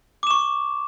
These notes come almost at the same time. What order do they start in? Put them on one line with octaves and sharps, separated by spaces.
D6 E7 C#6